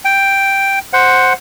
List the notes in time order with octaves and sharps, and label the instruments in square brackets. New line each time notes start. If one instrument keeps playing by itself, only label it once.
[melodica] G5
C5 F#5